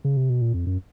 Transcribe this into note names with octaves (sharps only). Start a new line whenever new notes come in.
C#3
C3
B2
A#2
F2
F#2